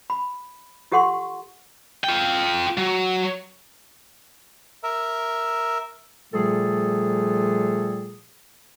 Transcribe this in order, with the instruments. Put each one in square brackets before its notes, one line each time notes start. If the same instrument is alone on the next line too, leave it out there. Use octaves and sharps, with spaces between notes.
[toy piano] B5
F4 G4 A4 F#5 C6 C#6
[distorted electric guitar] F4 G5
F#3
[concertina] A#4 E5
[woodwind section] A#2 F3 G3 A3 G#4 A4